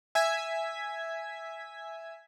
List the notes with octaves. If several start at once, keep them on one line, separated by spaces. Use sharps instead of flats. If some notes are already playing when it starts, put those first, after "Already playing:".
E5 G#5 G#6 B6